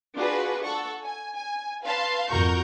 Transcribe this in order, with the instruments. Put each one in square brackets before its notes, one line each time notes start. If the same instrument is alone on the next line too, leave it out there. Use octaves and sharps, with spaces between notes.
[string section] D4 F4 F#4 G#4 B4
A4 F#5 C#6
G#5
G#5
B4 F5 A5 C6
F2 F#4 A#4 A#5 C#6 G6